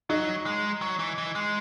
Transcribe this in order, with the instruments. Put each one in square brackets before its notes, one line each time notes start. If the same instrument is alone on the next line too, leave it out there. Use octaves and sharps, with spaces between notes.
[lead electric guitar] F#3 [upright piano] D#4
[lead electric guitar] G#3
F#3
E3
E3
G#3